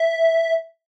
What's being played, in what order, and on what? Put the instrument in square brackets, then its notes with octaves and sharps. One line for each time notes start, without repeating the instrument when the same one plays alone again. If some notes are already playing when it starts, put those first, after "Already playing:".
Already playing: [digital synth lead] E5